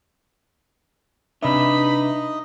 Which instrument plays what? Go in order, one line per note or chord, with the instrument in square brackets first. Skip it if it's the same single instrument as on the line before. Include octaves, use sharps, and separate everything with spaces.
[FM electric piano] C3 E5 [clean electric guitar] D4 B4 [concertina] D#4 D#5 [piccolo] B5